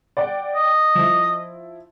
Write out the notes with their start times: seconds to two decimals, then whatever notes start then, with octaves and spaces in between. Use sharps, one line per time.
0.17 D5 F#5 G5
0.55 D#5
0.95 F3 E4